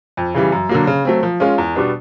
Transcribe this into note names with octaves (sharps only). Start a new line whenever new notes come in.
F2
C#3 E3 G3
F#2
D3 F#3 A#3
C#3
F#3 A3 C4
F3
G#3 C#4 F4
E2
B2 G3 B3 D4